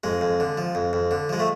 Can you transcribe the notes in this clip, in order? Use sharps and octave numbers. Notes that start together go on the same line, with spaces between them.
F2 G#3
F2
D3
F3
F2
F2
D3
F3 G#3
A3